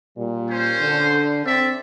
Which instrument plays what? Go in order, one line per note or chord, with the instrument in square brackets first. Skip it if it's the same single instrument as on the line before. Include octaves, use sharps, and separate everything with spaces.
[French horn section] A#2 G3
[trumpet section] C#4 C5
[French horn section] D3
[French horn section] C4 [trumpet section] A4 D5 E5